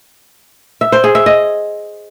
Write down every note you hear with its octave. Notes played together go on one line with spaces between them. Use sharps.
E5
C5
G#4
E5
D#5